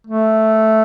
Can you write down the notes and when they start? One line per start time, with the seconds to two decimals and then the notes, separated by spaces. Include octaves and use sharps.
0.07 A3